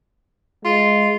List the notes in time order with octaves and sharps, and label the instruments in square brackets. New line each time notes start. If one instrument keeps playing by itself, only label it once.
[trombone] G#3 [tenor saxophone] F4